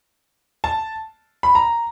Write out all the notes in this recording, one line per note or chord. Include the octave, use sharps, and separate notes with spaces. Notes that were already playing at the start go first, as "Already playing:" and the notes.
A5
B5
A#5